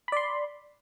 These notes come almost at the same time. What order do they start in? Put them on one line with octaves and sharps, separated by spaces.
B5 D5 C6